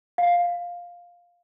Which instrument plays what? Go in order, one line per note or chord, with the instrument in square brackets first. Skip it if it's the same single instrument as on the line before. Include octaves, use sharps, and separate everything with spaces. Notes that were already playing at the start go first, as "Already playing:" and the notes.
[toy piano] F5